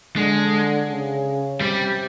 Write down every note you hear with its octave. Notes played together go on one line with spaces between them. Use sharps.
D3 G#3
C#3
C3 G3